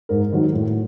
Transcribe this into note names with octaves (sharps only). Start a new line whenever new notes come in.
G#2 A#4
D#3 F#3
A2